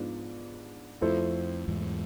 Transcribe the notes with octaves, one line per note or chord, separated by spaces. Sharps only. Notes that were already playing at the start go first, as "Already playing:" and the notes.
Already playing: G#2 F3 B3 D4
F2 F3 A3 E4 A4 C5
E2 G#2